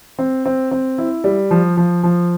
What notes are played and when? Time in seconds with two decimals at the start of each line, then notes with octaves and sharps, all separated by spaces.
0.19 C4
0.46 C4
0.71 C4
0.98 E4
1.24 G3
1.51 F3
1.77 F3
2.04 F3